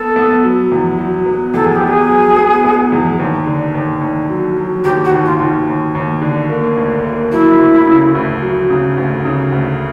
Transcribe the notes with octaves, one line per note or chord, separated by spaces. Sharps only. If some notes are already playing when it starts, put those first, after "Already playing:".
Already playing: B3 A4
B3
F#3
E2
F#3
B3
E2 A4
G#4
G4
B3
G#4
F#3
B3
B3
E2
D#2
D3
D#2
D#2
F#3
F#3
D#2 G4
F#4
D#2
F4
D#2
D#2
D#2
D3
A#3
D2
A#3
F#3 E4
D2
C#3
D2
F#3
C#3
D2
C#3
D2